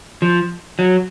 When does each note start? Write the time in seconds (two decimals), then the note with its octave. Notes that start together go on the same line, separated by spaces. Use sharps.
0.22 F3
0.79 F#3